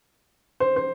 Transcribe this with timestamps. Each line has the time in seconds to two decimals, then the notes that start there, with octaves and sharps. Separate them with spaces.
0.60 C5
0.76 C5